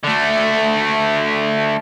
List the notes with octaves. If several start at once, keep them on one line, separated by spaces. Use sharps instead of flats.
D3 A3